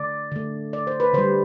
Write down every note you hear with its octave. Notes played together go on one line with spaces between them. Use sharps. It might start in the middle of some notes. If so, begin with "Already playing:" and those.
Already playing: D3 A3 D5
D3 A3
D5
C5
B4
D3 G3 C5